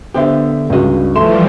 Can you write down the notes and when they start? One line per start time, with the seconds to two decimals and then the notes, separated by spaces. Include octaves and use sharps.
0.14 D3 B3 G4 C5 E5
0.70 C#2 G2 F#4 D#5
1.16 E3 F3 G3 A3 C6 E7